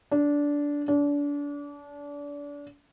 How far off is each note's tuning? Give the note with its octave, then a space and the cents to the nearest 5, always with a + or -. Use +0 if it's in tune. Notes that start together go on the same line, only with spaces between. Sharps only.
D4 -15
D4 -30